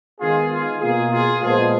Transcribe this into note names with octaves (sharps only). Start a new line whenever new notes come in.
D#3 G#3 B3 F4 G#4
F4 G#4
B2 A#3 F4 G#4
F4 G#4
A#2 F3 G#3 B3 F4 G#4